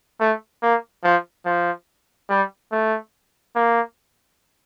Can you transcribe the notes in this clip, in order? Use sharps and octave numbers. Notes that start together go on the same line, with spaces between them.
A3
A#3
F3
F3
G3
A3
A#3